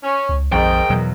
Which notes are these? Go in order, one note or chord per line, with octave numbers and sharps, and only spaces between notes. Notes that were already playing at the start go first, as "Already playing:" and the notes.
C#4
C#2
A#1 F2 G#2 D#3 G5
E2 B2 E3 F#3